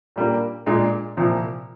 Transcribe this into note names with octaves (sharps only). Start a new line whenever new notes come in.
A#2 G3 A#3 D4
A#2 G#3 D4
C2 A#2 F3